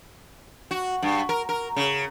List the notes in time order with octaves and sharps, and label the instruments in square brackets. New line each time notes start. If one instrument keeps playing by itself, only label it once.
[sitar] F#4
G2
A#4
A#4
C#3